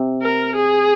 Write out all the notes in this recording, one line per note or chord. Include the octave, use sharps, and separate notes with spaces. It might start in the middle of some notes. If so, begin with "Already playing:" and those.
Already playing: C3
A#4
G#4